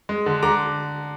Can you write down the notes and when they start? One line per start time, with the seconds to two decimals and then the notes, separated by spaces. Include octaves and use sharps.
0.09 G#3
0.26 D3
0.42 D3 A#5 D6